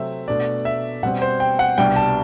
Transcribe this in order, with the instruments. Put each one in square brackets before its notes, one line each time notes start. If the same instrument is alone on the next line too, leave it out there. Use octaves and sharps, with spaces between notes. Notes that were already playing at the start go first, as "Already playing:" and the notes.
Already playing: [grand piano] C3 F#3 A3 C4 E5
B2 A3 D4 D5
E5
B2 G3 C4 F#5
C5
G5
F#5
C2 B2 G3 D4 G5
A5